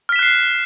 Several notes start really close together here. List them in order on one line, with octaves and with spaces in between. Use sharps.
F6 B6 E7 F#6 C7